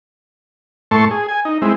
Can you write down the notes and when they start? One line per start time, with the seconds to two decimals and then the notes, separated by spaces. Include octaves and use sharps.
0.91 A2 A3 A5 C6 C#6
1.11 G#4
1.28 G#5
1.45 D#4
1.62 G#3 C4 E4